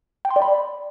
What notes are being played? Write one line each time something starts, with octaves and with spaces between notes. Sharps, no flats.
G5
C6
D5
B5